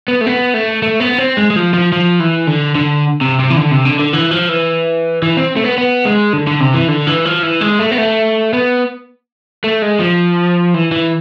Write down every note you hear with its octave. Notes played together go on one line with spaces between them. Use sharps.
B3
A3
B3
A3
A3
B3
C4
G#3
G#3
F3
F3
F3
E3
D3
D3
C3
C3
E3
D3
C3
D3
D3
E3
F3
E3
E3
C4
A3
B3
B3
G#3
D3
D3
C3
E3
D3
E3
F3
E3
G#3
A3
B3
A3
B3
A3
G#3
F3
E3
E3